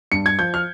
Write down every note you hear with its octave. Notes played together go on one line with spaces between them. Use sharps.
G2 C#7
G#6
F3 G6
F6